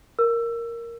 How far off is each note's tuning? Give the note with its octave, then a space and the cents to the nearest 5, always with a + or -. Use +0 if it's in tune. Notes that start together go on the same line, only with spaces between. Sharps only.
A#4 +0 E6 +20